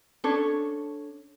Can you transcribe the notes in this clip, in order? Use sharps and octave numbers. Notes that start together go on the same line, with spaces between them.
C#4 D4 A4 C#5